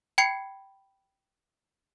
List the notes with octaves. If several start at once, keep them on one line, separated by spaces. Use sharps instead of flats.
G5 B5 G#6 C7 C#7